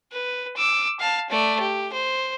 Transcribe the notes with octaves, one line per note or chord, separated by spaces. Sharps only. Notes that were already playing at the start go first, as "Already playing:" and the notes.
B4
D6 E6
F5 A5
A3 D5
G4
C5